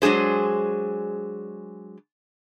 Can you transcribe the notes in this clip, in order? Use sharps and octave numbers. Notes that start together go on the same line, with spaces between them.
F#3 G#3 D4 G#4 C5